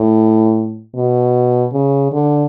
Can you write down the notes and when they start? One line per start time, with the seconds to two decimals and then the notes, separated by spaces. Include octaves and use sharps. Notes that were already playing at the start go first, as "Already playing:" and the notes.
Already playing: A2
0.95 B2
1.72 C#3
2.12 D3